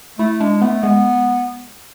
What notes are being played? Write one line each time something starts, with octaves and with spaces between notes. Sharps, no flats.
A3 E4
G#3 D4
A3 B3
G#3 B3